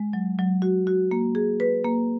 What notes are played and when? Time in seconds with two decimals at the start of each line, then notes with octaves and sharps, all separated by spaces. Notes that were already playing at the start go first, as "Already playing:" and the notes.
Already playing: G#3
0.13 F#3
0.39 F#3
0.62 F#4
0.87 F#4
1.11 A#3
1.35 G#4
1.60 B4
1.84 A#3